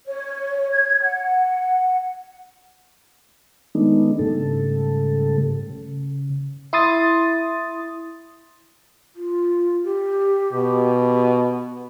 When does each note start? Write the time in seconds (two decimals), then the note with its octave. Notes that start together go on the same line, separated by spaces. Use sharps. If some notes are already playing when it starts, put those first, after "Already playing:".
0.06 C#5
0.72 G#6
1.02 F#5
3.75 D#3 G#3 A3 B3 D4 D#4
4.19 G#2 C#3 G3 A3 A4
5.70 C#3
6.73 E4 C6 D#6 A6
9.16 F4
9.84 G4
10.53 B2